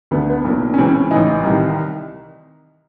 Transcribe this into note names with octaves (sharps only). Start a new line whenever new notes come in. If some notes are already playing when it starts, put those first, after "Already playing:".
D2 D3 B3
B3
B1 A#2
C#4
C#2 C#3 E3 C4
C#4
A1 A2 E3 D#4
C2 C3 D#3